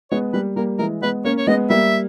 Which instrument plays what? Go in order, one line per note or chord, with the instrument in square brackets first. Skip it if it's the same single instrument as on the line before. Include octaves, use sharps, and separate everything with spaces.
[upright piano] G#3 B3 [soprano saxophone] C#5
[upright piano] G3 A#3 [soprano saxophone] B4
[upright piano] G3 A#3 [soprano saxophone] A#4
[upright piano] E3 G#3 [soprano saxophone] A#4
[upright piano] G#3 B3 [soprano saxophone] B4
[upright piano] A#3 C#4 [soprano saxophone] C#5
[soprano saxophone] C#5
[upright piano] G#3 B3 [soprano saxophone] D#5
[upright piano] G3 A#3 [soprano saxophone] E5